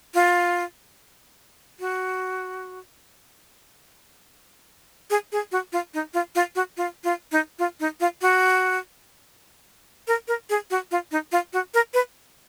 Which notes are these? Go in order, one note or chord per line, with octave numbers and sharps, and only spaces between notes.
F4
F#4
G#4
G#4
F#4
F4
D#4
F4
F4
F#4
F4
F4
D#4
F4
D#4
F4
F#4
A#4
A#4
G#4
F#4
F4
D#4
F4
F#4
A#4
B4